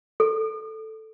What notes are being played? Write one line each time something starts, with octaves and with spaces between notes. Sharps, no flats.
A4